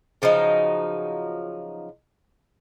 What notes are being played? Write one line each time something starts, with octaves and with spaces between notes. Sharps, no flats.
C#3 F3 F#3 D#4